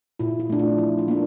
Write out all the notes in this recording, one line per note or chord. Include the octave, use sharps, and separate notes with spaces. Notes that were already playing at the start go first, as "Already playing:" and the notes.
A#2 E4
F4
A3 D4
F4
F3 E4
F4
A#3 D4